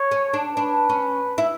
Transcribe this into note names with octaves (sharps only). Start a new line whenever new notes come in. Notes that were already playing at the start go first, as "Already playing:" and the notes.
Already playing: C#5
C#4
D4
D4 B4
C#4
E4